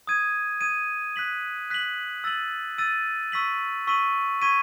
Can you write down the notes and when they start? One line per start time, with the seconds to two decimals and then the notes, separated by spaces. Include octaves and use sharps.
0.07 D#6 G#6 D#7
0.61 D#6 G#6 D#7
1.16 F#6 B6 F#7
1.70 F#6 B6 F#7
2.24 E6 A6 D#7 F#7
2.78 E6 A6 D#7 F#7
3.32 C#6 E6 B6 D#7 F#7
3.87 C#6 E6 B6 D#7 F#7
4.42 C#6 G#6 B6 D#7